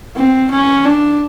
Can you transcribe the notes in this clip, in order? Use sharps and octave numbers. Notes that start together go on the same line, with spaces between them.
C4
C#4
D4